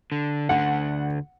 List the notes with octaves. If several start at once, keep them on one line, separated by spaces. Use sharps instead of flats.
D3
D2 D3 F#5